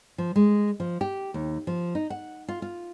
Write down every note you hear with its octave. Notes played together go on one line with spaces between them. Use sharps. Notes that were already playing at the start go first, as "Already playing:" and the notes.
F3
G#3
F3
G4
D#2
F3
D#4
F#5
F4
F4